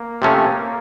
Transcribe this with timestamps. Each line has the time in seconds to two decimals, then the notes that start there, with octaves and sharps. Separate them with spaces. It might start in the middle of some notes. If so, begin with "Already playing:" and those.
Already playing: A#3
0.22 C3 F3 A3 C#4